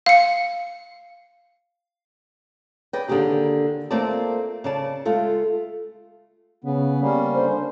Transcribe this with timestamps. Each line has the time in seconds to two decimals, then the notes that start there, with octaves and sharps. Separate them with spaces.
0.06 F5 C#7
2.93 G#4 B4 D5 D#5 G5
3.09 D3 D#3 A#3 G4 G#4
3.91 A3 A#3 C4 F4 D5 A5
4.64 C#3 D5 A5
5.05 G#3 A3 F4 A4
6.64 C#3 B3
7.01 G3 A#3 C#4
7.34 D3 C5